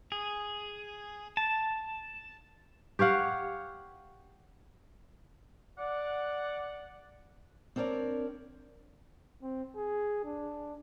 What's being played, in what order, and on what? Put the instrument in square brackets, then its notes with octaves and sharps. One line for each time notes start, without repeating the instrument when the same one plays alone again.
[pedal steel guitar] G#4
A5
[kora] G4 C#5 F5 F#5
[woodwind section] D5 F#5
[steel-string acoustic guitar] C4 D4 A#4 C#5 D5
[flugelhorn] C4
G#4
D4